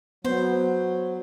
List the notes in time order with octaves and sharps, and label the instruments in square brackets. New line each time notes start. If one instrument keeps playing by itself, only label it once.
[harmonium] F#3 [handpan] B3 [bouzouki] C5